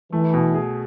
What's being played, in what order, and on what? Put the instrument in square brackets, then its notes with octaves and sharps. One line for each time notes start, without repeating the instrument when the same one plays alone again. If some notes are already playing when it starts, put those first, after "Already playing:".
[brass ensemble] E3 [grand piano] A3
[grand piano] B2
G#4